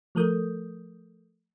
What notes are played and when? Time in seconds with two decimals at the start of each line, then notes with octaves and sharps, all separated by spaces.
0.15 F3 A3 A4 A#4 D#6 G6